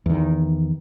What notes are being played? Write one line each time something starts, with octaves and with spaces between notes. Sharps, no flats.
E2 D#3